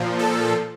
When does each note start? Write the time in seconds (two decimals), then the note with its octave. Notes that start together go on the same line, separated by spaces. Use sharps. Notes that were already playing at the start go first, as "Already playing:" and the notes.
Already playing: A#2 F3
0.19 A4